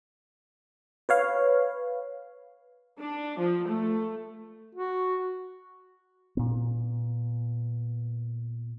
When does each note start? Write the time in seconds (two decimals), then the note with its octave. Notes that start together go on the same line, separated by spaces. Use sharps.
1.09 B4 C#5 F5
2.99 D4
3.39 F3
3.68 A3
4.75 F#4
6.37 A#2 B3